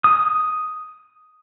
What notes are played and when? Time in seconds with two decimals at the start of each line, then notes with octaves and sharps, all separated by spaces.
0.04 D#6